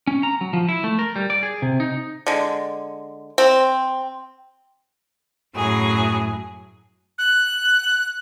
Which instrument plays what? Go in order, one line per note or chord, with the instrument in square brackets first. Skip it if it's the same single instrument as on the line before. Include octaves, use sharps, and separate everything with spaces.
[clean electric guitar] C#4
A#5
F#3
F3
E4
A3
A#4
G3
D5
G#4
C3
D#4
[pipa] D3 G#3
C4
[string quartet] F#2 A2 F#3 G#4
[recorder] F#6